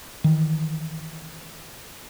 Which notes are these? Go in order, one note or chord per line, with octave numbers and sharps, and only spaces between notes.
D#3 E3